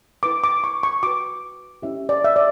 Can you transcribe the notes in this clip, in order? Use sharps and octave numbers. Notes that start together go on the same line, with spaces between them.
E4 B4 D6
D6
C#6
C#6
F#4 B4 D6
C#4 E4 G4 E5
D5
E5
D5